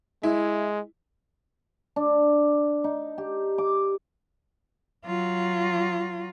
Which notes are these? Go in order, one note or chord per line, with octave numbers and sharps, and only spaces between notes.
G#3 E4
D4
D#4
G4
D6
F#3 F4